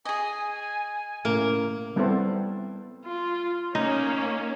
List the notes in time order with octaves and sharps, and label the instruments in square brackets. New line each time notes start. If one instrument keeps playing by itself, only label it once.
[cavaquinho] G#4 D#5 [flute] G#5
[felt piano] A2 C#3 [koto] A#3
[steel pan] G3 B3 C4 E4 A4 C5
[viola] F4
[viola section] A#3 C#4 [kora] D#4